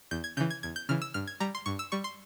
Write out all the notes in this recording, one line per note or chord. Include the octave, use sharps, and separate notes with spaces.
E2 G6
G#6
C#3 E3 G6
G#6
E2 G#6
G6
C#3 E3 F6
E6
G2 F6
G#6
G3 A#5
C6
G2 C#6
E6
G3 C#6
C6